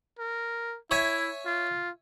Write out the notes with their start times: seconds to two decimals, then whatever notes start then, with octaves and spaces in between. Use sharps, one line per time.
0.19 A#4
0.91 E4 C#5 E5 G#5
1.46 F4